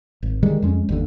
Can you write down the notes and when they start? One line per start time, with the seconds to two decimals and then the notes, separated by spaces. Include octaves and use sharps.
0.23 G#1
0.42 D3 D#3 G3 G#3
0.62 F2 G#3 C#4
0.89 G1 D#2 D3